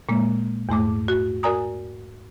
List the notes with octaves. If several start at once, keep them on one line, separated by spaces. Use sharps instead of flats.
A#2 G#3 A#3
E2 G#2 A3 D6
F#4
F#4 A#4 D5 G#5 A#5 D#6